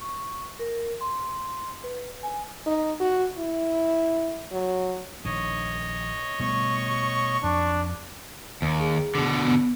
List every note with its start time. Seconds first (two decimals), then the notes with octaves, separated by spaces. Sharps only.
0.01 C#6
0.59 A#4
1.01 C6
1.84 B4
2.23 G#5
2.66 D#4
3.00 F#4
3.38 E4
4.52 F#3
5.25 A#1 D#3 C#5 D#5
6.40 B2 G3 A3 C#6
7.44 F2 D4
8.62 D#2
8.80 G#4
9.15 B2 D3
9.45 B3